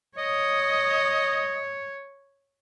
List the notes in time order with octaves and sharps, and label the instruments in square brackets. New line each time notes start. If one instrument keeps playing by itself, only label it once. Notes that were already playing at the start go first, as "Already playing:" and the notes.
[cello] C#5 [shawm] D#5